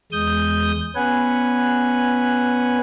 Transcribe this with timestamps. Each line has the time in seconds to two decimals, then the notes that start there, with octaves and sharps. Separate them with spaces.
0.12 E2 G#3 D#6 G6
0.95 B3 C#4 B4 F#5 G#5